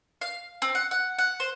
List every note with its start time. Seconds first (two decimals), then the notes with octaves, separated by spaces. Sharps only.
0.21 F5
0.62 C4
0.75 F#5
0.91 F#5
1.18 F#5
1.40 C5